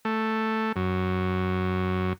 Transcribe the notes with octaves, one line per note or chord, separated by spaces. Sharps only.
A3
F#2